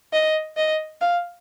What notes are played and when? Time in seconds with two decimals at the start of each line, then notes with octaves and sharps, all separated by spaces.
0.13 D#5
0.57 D#5
1.01 F5